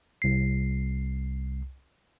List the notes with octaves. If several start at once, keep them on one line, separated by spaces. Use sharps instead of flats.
C2 C7